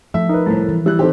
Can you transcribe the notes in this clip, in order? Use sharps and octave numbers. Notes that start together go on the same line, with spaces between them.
F3 A3 E5
D#4 A#4 B4
C2 A2 A4
E3
G3 E4 F#6
D#3 C4 G4 A4